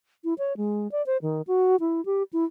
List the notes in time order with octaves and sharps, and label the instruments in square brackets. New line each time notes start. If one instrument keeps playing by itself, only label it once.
[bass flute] E4
C#5
G#3
D5
C5
D#3
F#4
E4
G4
E4